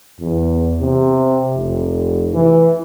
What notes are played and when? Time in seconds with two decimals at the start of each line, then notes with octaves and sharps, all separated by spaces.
0.20 E2
0.80 C3
1.55 F1
2.33 E3